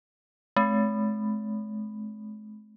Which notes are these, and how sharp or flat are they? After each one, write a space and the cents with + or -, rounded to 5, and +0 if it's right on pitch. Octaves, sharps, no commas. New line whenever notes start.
G#3 +45 C4 +0